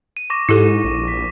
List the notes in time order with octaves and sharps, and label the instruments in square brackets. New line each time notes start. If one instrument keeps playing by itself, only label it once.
[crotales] D#7
C#6 D6 A#6
[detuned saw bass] G#2 [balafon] E4 G4 A4
[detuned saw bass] A#1
[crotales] B6